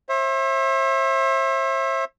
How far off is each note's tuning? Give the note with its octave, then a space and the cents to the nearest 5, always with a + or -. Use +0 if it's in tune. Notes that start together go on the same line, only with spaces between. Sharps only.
C5 +45 E5 +0